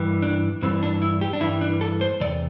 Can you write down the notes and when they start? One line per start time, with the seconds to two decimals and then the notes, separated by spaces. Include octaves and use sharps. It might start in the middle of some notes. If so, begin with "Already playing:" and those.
Already playing: G2 E3 G3
0.22 D4
0.62 G2 E3 G3 C4
0.83 D4
1.02 E4
1.21 G4
1.33 D4
1.41 G2 E3 G3 E4
1.61 D4
1.81 A4
2.01 C5
2.20 E2 C3 D5